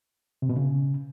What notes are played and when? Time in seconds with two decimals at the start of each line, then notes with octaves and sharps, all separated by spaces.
0.42 C3
0.49 B2
0.57 C#3